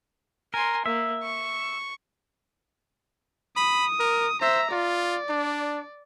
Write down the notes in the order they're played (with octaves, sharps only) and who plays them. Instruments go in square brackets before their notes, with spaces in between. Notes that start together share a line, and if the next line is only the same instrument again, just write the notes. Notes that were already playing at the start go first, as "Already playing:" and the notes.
[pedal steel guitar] A#4 [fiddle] G#5 C6
[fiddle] A#3 [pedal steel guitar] E5
[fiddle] C#6
[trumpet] B5 [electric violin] D#6
[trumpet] A#4
[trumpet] C5 [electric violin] E5 A#5
[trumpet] F4 [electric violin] D5
[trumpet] D4